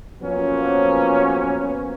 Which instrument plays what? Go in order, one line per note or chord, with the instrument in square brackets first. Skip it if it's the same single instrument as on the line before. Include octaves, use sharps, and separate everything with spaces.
[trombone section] F3 F#3 A#3 B3 C#4